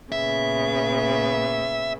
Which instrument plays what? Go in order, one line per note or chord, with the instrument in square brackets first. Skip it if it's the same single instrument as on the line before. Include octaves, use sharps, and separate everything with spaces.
[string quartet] A#2 C#3 B3 [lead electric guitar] E5